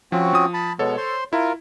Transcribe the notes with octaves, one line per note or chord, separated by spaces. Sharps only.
F3 C4 C#4 F#4
F3 D#6
A5 B5
B2 G#3 B3 A4 C#5
C5 C6
E4 F4 A#4